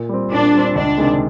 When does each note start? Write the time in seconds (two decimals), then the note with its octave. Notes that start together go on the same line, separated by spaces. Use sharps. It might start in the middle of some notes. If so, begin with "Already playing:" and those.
Already playing: A#2
0.09 G3 C4
0.31 A#2 D4
0.53 G3 C4
0.75 C#2 D4
0.98 C3 D#3 G#3